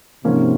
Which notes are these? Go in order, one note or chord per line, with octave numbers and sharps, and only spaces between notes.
G#2 C3 F3 A#3 C#4